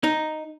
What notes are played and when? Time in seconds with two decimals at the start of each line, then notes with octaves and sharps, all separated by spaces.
0.04 D#4